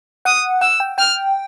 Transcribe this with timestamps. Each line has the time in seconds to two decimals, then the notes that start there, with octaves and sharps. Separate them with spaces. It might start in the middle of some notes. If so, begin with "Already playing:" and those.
0.25 F#5 D#6
0.61 F#5 E6
0.80 G5
0.98 G5 F6